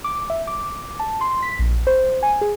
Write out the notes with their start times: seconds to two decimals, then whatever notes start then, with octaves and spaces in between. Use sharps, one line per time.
0.04 D6
0.30 E5
0.47 D6
1.00 A5
1.21 C6
1.42 B6
1.59 A#1
1.87 C5
2.23 G#5
2.41 G#4